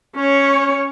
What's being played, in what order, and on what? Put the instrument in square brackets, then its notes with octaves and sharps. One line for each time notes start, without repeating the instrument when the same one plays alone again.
[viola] C#4 C#5